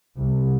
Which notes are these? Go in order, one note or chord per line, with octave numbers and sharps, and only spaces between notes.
C2